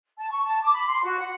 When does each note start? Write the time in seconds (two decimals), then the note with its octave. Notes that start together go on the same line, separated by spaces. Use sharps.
0.17 A5
0.30 C#6
0.45 A5
0.62 D6
0.73 B5
0.87 C6
1.03 F#4
1.19 F#5